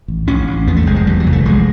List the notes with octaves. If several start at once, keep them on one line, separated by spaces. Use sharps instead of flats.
A1
A1 C#4
A1
E2 B3
A3
F1 G#3
G#3
E2 G3
F#3
F1
A3
A1 G#3